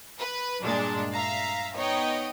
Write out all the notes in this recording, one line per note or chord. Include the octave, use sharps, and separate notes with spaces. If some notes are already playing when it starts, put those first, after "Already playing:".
B4
G2 A#2 G#3 D4
E5 F5 A#5
B3 D#4 C#5 D#5 G5